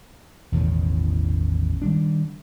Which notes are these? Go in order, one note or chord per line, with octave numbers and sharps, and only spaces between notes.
A1 E2 B2 D#3
D#3 G3 D4